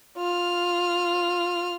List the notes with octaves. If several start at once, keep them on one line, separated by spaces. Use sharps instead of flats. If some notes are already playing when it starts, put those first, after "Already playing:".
F4 F6